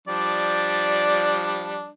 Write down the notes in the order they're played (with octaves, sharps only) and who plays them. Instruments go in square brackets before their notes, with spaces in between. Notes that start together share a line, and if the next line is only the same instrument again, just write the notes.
[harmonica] F3 G3 D4 [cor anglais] D5